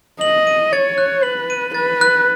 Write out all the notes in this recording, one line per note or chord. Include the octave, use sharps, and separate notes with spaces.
D#5 F#7
D#7
C#5 A6
F#6
B4 F#7
D#7
B4 A6
F#6